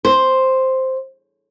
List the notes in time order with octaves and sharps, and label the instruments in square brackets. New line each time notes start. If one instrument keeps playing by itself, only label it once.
[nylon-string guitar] C5